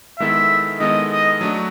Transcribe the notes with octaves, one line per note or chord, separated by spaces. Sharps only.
D#3 G#3 B3 E4 A4 E5
D#3 G#3 B3 E4 A4 D#5
D#5
F#3 A3 D4 F#4